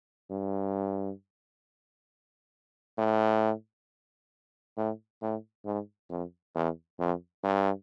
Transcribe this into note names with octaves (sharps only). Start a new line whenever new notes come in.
G2
A2
A2
A2
G#2
F2
E2
F2
G2